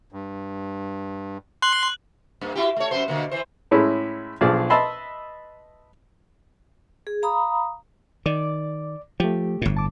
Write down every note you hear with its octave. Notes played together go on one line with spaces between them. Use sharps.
G2
C6 F#6 F#7
G2 A#3
E4 F#4 G4
A3 C#5
F#2 B3 C5
B2 D3 A#3
E3 C5
A2 G#3 C#4 E4
B1 F3 D4 G#4 D5
B4 D#5 E5 A5 B5 C6
G#4
F5 A#5 B5 D#6
D#3 D5 D6
F3 A3 G4
G1 A2
A5 D6